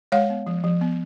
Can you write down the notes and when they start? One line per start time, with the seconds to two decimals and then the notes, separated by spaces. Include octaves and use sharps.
0.12 G#3 C#5 F5
0.30 B3
0.47 F3
0.64 F3
0.81 B3